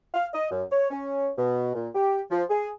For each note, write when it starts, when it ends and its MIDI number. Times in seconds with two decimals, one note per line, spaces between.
0.14 0.26 77
0.33 0.49 75
0.51 0.63 42
0.71 0.89 73
0.90 1.30 61
1.38 1.73 47
1.74 1.88 46
1.94 2.21 67
2.30 2.43 53
2.50 2.70 68